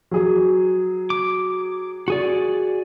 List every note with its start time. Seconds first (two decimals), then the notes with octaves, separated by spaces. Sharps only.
0.11 F#3 G#4
1.10 D6
2.08 F#4 G#4 D5